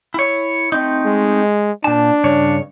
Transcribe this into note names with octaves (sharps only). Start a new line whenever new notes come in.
E4 C#5
A3 C4 D#4
G#3
A#2 D4 A5
G2 C#3 C#5